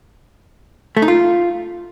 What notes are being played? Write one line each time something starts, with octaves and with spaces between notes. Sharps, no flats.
A3
D#4
F4